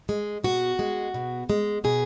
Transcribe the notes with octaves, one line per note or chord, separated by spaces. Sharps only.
G#3
B2 F#4
G#3
B2
G#3
B2 G#4